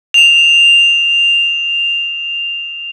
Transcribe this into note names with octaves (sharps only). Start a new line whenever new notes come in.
E7 F7